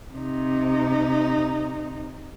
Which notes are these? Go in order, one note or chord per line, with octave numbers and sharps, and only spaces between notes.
C3 D#4